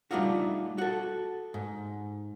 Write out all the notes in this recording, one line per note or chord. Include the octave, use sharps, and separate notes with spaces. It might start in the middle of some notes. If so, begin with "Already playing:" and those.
G3 A3 D4 D#4 F4 F#4
F#4 A4
G#2